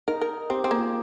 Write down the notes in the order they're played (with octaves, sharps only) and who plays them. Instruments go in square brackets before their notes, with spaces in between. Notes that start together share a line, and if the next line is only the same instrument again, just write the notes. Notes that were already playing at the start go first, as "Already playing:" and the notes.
[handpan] D#4 [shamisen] A#4
[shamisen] A#4
[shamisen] C4 [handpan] G4
[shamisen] C4 [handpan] G#4
[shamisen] A#3
[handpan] F4